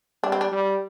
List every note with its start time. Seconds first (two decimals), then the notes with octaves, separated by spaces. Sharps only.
0.24 G3 D4
0.32 C4
0.41 D4
0.52 G3